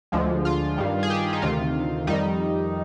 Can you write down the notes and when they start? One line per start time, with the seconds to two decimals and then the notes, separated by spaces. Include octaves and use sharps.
0.12 D2 D3 F3 G#3
0.45 F4
0.78 G2 D#3 G3
1.03 G#4
1.10 G4
1.33 D#4
1.42 D2 C3 D#3 F4
2.07 F2 D#3 G3 D#4